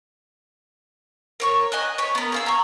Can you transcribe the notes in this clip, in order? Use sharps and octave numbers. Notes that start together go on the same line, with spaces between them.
A#4 C#5 C#6
D#5 G#5 F#6
C#5 B5
B3 A#4
G#4 F5 E6
A#5 C#6